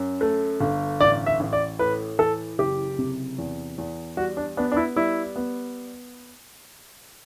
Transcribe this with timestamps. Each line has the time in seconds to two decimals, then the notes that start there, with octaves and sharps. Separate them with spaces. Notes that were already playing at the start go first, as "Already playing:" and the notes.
Already playing: F#2
0.21 A3
0.61 G1
1.00 A1 D5
1.26 E5
1.40 A1
1.53 D5
1.79 A2 B4
2.19 E3 A4
2.59 F#1 G4
2.99 C3
3.38 E2
3.78 E2
4.17 G3 F#4
4.37 D4
4.57 B3 D4
4.72 D4
4.76 E4
4.96 G3 E4
5.36 B3